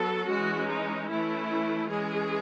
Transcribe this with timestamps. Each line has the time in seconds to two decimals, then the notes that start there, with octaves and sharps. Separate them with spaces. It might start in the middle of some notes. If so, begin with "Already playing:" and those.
Already playing: F#3 B3 A4
0.26 E3 G#3 C#4 F#4
0.67 D#4
1.08 E3 A3 C#4 E4
1.89 E3 G#3 C#4 G#4